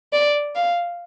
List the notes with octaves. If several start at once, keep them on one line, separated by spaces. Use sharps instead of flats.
D5
F5